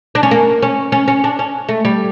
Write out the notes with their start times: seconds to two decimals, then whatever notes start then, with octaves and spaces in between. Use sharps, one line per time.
0.15 D4
0.23 C#4
0.31 A#3
0.62 C#4
0.92 C#4
1.08 C#4
1.24 D4
1.39 C#4
1.69 A3
1.85 G3